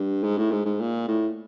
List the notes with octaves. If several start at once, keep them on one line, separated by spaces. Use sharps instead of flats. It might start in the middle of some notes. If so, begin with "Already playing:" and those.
Already playing: G2
G#2
A2
G#2
G#2
A#2
A2